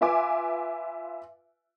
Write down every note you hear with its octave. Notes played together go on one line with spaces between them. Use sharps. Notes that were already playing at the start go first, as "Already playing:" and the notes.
F4 B4 E5 G#5 D6